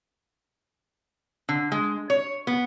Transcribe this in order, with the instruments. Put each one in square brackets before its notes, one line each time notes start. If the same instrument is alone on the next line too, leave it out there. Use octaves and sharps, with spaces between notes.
[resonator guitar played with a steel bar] D3
G#3
C#5
B3